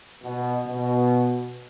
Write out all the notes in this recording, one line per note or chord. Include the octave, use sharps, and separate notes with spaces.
B2
B2